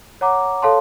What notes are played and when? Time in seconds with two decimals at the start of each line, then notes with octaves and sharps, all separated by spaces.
0.21 C#5 F#5 A#5 D6
0.62 A4 C#5 F5 A5 C6